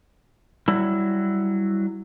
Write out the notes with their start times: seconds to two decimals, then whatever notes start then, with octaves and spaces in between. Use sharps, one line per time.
0.68 F#3 G3 E4